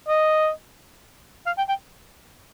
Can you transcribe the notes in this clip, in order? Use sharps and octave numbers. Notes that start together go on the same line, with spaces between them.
D#5
F5
G5
G5